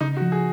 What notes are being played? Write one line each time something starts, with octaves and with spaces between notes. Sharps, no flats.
C#3 D#4
F#4
F3
G#4